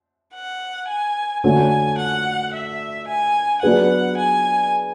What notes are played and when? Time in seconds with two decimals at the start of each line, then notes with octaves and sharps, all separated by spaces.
0.34 F#5
0.88 G#5
1.44 D3 A3 C#4 F#4 A4 G#5
1.98 F#5
2.53 E5
3.08 G#5
3.62 F#3 B3 D4 G#4 B4 F#5
4.17 G#5